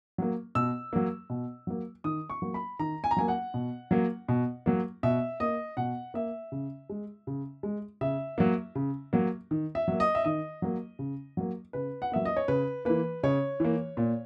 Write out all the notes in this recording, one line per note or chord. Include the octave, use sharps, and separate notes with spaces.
F#3 A#3
B2 E6
F#3 A#3
B2
F#3 A#3
D#3 D#6
C#6
F#3 A#3
B5
D#3 A#5
G#5
A#5
F#3 A#3 G#5
F#5
B2
F#3 A#3
B2
F#3 A#3
B2 E5
A#3 D#5
B2 F#5
A#3 E5
C#3
G#3
C#3
G#3
C#3 E5
F#3 A#3
C#3
F#3 A#3
D#3
E5
F#3 A#3
D#5
E5
D#3 D#5
F#3 A#3
C#3
F#3 A#3
C#3 B4
F#5
F#3 A#3 E5
D#5
C#5
C#3 B4
E3 A#3 B4
C#3 C#5
E3 A#3
A#2